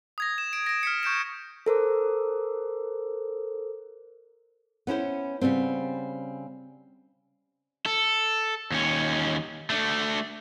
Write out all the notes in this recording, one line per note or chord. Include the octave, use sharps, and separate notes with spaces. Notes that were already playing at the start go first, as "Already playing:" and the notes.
D#6 G#6 A#6
E7
D7
A#6 D7
F6 B6 C#7
C#6 G6 D7 E7
A4 A#4 C5 D6
B3 C#4 E4 C5
C#3 G3 B3 C4
A4
D#2 C#4
A3 D4